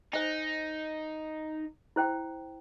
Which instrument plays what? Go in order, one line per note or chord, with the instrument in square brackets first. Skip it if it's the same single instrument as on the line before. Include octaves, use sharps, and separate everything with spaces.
[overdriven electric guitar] D#4 [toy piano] C5 G#5
[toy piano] E4 C5 G5